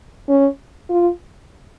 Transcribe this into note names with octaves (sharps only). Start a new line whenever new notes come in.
C#4
F4